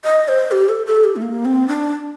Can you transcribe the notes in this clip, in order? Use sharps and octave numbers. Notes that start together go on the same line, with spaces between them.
D#5
C5
G4
A4
A4
G4
A3
A#3
C4
D4